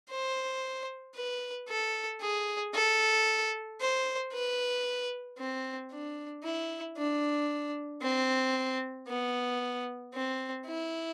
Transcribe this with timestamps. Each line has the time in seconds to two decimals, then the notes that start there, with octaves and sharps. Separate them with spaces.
0.10 C5
1.15 B4
1.69 A4
2.21 G#4
2.74 A4
3.80 C5
4.32 B4
5.38 C4
5.91 D4
6.44 E4
6.96 D4
8.02 C4
9.08 B3
10.13 C4
10.66 E4